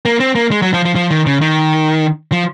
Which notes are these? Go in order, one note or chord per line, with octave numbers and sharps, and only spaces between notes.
A#3
C4
A#3
G#3
F#3
F3
F3
F3
D#3
C#3
D#3
F3